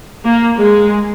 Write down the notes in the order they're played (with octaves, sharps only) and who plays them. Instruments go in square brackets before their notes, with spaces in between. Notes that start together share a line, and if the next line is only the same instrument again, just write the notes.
[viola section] A#3
G#3